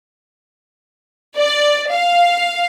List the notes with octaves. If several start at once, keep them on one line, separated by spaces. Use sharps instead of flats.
D5
F5